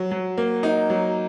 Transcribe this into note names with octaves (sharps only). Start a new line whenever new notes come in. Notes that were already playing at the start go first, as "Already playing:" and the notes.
Already playing: F#3
F#3
A#3
D#4
F#3